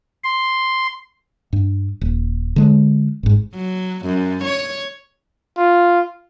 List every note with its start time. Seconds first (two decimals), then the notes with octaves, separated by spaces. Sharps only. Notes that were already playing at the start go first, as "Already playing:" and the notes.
0.24 C6
1.53 G2
2.01 D#1
2.56 D3 G#3
3.23 G#1 G#2
3.55 F#3
4.05 F#2
4.44 C#5
5.58 F4